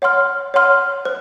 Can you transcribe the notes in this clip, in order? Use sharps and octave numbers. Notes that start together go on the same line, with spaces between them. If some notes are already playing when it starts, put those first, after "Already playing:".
C#5 F#5 C6 F6
C#5 F#5 C6 F6
C5